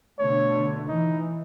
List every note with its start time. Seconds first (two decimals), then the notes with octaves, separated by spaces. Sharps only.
0.19 B2 D3 A3 C#5
0.88 E3 D#4